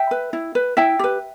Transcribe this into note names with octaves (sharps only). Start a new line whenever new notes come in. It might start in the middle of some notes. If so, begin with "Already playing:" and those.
Already playing: E5 G5
B4
E4
B4
E4 E5 G5
G4 B4